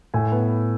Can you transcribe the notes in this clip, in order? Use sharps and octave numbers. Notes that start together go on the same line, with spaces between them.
A2 G#5
B3